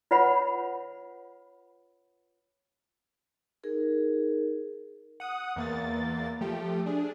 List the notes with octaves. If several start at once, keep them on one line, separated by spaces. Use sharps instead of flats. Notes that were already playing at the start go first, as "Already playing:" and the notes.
F4 B4 C#5 F#5 B5
D#4 G#4 A#4
F#5 D#6
E2 A#3 A6
F3 A3 G4
D4 G#4